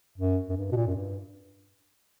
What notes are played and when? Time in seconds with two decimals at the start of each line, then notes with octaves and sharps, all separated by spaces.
0.18 F#2
0.49 F#2
0.57 G2
0.72 B2
0.76 A#2
0.87 F#2
0.96 G2